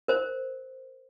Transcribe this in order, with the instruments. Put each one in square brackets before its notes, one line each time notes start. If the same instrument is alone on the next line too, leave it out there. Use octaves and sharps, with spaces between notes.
[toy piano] A#4 C5